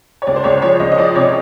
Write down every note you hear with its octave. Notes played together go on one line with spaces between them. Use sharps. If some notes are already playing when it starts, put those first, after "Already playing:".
C#5
C#2 D5
C5
C#2 C#5
F3 C#5
C#2 D#5
D#5
F3 D5
C3 C#5